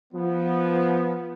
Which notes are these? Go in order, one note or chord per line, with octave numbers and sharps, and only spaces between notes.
F3 B3